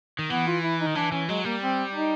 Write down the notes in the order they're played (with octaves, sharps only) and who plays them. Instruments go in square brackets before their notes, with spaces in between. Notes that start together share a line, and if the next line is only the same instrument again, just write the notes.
[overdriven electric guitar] D#3
[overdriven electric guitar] E3 [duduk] B3
[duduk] F4
E4
D#4
[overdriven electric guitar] D#3
[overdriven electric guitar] E3 [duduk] D4
[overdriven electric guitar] E3 [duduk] C#4
[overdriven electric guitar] F#3 [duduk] G#3
[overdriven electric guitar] G3 [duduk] A#3
[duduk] C4
D#4